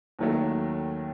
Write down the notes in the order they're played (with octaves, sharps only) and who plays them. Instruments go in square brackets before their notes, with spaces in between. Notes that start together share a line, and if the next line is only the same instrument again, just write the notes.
[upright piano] D#2 D#3 F#3 A3